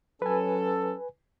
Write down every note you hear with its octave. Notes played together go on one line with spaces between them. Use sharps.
F#3 C#4 A4 B4 G#5